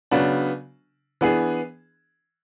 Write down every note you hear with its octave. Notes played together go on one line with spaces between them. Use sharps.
C#3 F#3 B3 D4
E3 B3 D4 G#4